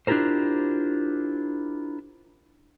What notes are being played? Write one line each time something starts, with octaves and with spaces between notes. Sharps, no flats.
D4 E4 F4 G4 A#4 C5